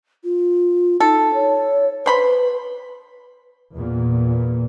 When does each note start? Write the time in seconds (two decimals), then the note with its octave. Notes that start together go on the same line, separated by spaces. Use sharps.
0.24 F4
1.00 D#4 A4
1.34 C#5
2.06 B4 C5 B5 C6
3.74 E2 A#2